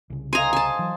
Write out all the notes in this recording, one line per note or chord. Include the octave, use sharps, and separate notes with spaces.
C2 C#3
C5 D#5 F5 G#5 A#5
G#5 A5
E3 F#3